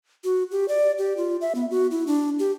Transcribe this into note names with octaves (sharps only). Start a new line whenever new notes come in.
F#4
G4
D5
G4
F4
E5
B3
F#4
E4
D4
G4